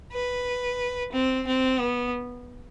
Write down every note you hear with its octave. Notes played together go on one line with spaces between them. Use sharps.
B4
C4
C4
B3